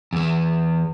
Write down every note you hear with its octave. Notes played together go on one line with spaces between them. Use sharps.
E2 E3